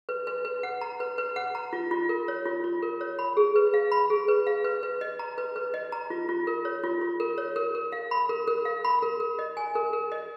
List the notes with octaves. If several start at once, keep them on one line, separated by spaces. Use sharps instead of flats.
B4
B4
B4
F#5
A#5
B4
B4
F#5
A#5
F4
F4
A#4
C#5
F4
F4
A#4
C#5
B5
G#4
B4
F5
B5
G#4
B4
F5
B4
B4
D#5
A#5
B4
B4
D#5
A#5
F4
F4
A#4
C#5
F4
F4
A#4
C#5
A#4
A#4
F5
B5
A#4
A#4
F5
B5
A#4
A#4
D#5
G#5
A#4
A#4
D#5